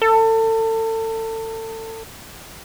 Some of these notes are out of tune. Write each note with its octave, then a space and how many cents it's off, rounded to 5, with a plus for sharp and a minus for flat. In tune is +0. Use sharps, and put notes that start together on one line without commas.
A4 +30